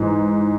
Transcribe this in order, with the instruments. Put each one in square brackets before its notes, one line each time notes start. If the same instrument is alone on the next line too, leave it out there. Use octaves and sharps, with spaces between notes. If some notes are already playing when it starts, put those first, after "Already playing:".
Already playing: [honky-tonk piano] G#2 E3